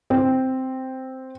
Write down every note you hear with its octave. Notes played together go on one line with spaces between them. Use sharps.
C4